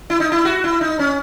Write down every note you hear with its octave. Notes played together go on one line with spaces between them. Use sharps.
E4
D#4
E4
F#4
E4
D#4
C#4